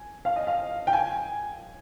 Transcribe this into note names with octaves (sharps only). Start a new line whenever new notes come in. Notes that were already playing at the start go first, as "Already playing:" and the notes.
Already playing: G#5
F5
D#5
F5
G5
G#5